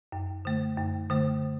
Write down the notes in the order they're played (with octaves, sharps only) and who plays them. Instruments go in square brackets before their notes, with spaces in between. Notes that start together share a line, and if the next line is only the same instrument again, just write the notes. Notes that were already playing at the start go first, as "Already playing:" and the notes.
[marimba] F#2
D3 A3
F#2
D3 A3